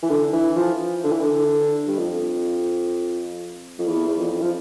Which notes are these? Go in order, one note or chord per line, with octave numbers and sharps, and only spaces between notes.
E3
D3
E3
F3
D3
E3
D3
G2
F2
F2
E2
E2
F2
F3